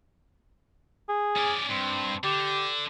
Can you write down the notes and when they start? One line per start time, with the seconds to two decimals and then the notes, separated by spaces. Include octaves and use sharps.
1.09 G#4
1.36 C#4 D5
1.69 G2 C4
2.24 D3 G4